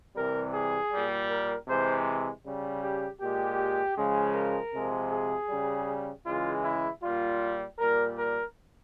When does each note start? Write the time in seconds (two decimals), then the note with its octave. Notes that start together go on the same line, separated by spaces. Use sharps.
0.16 C3 E3 G3 A#4
0.53 G#4
0.92 A#2 G3
1.30 A#4
1.68 C3 E3 G#3 C5
2.44 C#3 G3
2.83 G4
3.20 A#2 G#3 G4
3.97 C#3 F3 G#3
4.35 A#4
4.73 C3 F3 G#3
5.12 G#4
5.50 C#3 G3
6.26 C#3 E3 G#3 F4
6.64 E4
7.02 A#2 G3 F4
7.78 A#2 G3 A#4
8.16 A#4